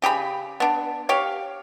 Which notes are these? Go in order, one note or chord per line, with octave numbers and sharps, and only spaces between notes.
C#3 G4 G#4 B5
B3 D4
G4 C#5 F5